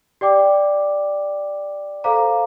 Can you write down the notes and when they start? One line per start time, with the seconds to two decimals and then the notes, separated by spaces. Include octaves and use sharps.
0.21 G4 D5 G5 D6
2.04 A4 C5 F5 A#5 D6